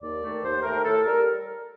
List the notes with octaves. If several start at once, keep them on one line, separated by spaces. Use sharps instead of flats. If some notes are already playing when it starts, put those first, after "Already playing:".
D#2 D5
D#3 A3
D#2 C5
D#3 A3 A#4
A2 A4
G3 A#4